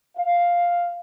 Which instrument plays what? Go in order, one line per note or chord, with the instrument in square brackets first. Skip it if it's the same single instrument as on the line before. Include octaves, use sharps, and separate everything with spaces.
[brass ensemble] F5